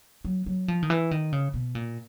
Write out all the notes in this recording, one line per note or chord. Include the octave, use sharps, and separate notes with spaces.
F#3
F#3
F3
D#3
E3
D#3
C#3
B2
A#2